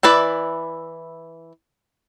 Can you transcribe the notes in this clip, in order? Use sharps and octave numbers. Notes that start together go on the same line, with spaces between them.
E3 E4 B4 D5